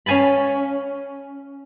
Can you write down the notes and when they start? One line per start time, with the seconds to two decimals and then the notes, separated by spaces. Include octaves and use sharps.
0.06 C#4 F5 G#5 A5 B5